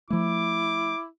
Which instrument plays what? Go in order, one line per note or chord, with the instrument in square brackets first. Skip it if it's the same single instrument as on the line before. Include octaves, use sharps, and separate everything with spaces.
[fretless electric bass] F3 A3 [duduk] E4 [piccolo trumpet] D6